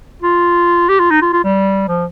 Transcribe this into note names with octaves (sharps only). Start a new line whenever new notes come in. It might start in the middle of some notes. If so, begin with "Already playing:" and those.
F4
G4
F4
D#4
F4
F4
G3
F3